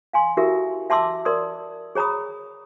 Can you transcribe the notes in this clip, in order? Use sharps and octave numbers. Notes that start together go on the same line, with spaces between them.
F5 G#5 C6
E4 F#4 G4 A4 A#4 E5
E5 A5 C6 D6 E6
A#4 D5 C6 D#6
G#4 C#5 A#5 B5 D#6